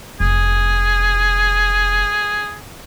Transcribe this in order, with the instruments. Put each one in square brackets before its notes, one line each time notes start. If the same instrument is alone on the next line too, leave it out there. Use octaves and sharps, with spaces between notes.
[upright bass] F1 [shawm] G#4